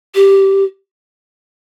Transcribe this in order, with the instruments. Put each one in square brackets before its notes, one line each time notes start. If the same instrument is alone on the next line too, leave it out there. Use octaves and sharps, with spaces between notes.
[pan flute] G4